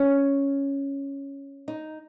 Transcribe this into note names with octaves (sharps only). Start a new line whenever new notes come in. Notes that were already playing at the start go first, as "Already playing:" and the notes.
Already playing: C#4
D#4